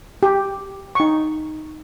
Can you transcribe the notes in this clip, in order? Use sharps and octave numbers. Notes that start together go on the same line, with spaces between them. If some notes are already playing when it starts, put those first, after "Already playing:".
G4
D#4 C#6